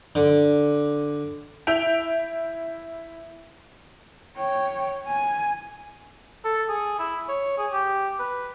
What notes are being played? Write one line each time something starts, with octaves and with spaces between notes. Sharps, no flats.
D3
E4 E5 G6 D7 F7
C#5 G5
G#5
A4
G#4
E4
C#5
G#4
G4
B4